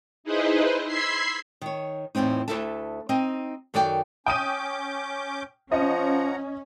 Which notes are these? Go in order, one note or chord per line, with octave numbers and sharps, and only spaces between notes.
D#4 E4 G#4 B4 C5 D#5
B5 C6 E6 G#6 B6 C7
D#3 C#5
E2 A2 B3 C4 D#4
D2 G#2 E4 A4 E5 A5
C4 D#4 D#5
F#2 D#3 F#4 A4 D5 G5
C#4 G5 D6 D#6 G6 D#7
F3 C#4 D#5 F#5 A#5